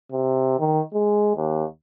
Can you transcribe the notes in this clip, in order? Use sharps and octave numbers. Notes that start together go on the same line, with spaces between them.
C3
D#3
G#3
D#2